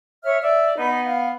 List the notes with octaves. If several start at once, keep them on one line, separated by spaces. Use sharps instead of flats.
C#5 E5 F6
D5 E5
B3 D#4 B5
F5